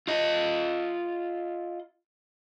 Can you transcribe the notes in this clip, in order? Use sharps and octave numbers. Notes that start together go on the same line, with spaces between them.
F4 D#5